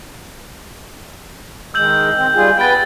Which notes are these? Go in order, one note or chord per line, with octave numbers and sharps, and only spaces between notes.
D#3 G#3 E6 G6 F#7
C4
G3 F4 G#4
B3 B4 G5 G6 A6